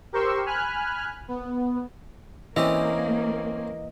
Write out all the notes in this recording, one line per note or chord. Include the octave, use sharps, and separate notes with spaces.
G4 A#4 C5 C6 C#6 E6
G#5 B5 F6 F#6
B3
E3 A#3 C4 C#4 G4 D#5